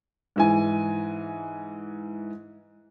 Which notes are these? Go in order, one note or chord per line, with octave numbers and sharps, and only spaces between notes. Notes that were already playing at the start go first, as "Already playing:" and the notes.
G#2 E3 G#5